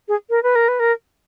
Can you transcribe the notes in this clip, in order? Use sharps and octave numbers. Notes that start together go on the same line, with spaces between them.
G#4
A#4
B4
A#4
B4
A#4